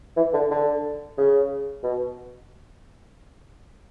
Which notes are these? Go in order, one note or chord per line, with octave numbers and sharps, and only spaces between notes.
E3
D3
D3
C#3
B2